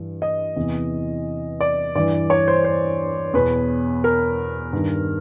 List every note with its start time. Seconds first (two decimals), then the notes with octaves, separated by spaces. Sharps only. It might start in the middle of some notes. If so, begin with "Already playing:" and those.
Already playing: G2 E3
0.22 D#5
0.56 E2 C3 E3
1.61 D5
1.95 G2 E3 D5
2.30 C#5
2.48 C5
2.64 C5
3.34 E2 B2 B4
4.04 A#4
4.73 G2 D#3